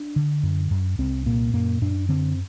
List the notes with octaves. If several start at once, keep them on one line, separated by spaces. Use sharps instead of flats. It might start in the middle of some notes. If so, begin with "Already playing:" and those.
Already playing: D4
D3
F#2
F#2
C2 C4
A#2 A#3
F#2 A#3
F#2 D4
D3 C4